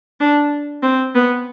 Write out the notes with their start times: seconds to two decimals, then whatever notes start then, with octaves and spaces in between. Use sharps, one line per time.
0.20 D4
0.83 C4
1.15 B3